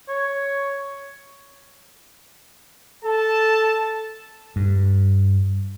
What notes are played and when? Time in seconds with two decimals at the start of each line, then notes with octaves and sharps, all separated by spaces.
0.09 C#5
3.04 A4 A5
4.56 G2